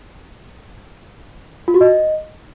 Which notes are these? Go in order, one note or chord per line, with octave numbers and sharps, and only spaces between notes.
F4
F#4
D#5